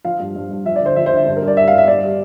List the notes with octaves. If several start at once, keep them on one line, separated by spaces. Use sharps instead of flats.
F3 F5
G2
G2
G2
F3 E5
D5
D3 C5
F3 E5
D3 C5
E5
G2
A#4
G2
D5
G2 E5
G2 F5
E5
G2 D5
G3